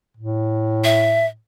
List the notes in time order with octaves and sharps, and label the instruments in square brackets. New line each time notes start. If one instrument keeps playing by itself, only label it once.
[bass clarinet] A2
[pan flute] E5